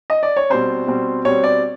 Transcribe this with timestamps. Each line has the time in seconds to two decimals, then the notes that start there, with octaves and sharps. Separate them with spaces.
0.10 D#5
0.23 D5
0.37 C#5
0.50 B2 G3 C4 C5
0.87 B2 G3 C4
1.25 B2 G3 C4 C#5
1.44 D5